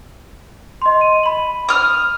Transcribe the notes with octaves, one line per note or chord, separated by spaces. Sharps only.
D#5 C6
D#7
B5 F#7
D#6 F6